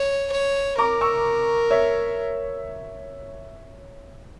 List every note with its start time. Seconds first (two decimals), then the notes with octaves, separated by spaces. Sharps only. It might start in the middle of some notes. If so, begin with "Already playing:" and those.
Already playing: C#5
0.32 C#5
0.78 A#4 A#5 D6
1.01 C#6 E6
1.71 C#5 E5